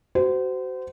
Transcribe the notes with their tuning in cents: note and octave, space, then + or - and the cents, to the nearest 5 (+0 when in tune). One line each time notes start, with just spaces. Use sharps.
F#4 +30 C5 -30